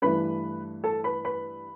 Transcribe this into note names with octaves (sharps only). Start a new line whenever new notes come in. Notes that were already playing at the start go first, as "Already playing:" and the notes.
G2 E3 A3 B4 B5
A4 A5
B4 B5
B4 B5